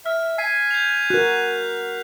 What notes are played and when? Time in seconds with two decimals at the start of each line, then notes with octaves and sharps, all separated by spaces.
0.06 E5 F6
0.38 G#5 B6 C7
0.71 G6 C7 F7
1.10 F#4 A#4 F#6